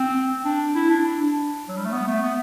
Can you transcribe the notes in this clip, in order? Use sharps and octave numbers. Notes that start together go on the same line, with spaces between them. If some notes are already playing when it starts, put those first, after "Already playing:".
Already playing: C4
D4
E4
D4
F#3
G3
A3
B3
A3
B3